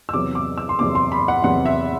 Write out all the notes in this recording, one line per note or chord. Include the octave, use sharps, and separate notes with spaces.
E6
E2 C3 F#3 B3 D6
D6
E6
C6
E2 C3 F#3 B3 D6
C6
B5
F#5
E2 C3 F#3 B3 F#5
E5